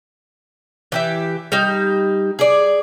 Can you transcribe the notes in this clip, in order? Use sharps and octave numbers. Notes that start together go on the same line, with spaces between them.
E3 G4 E5
G3 D#4
G#4 D5